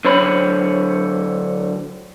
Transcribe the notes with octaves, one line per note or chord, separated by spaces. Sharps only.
D3 F#3 C5 C#5 B5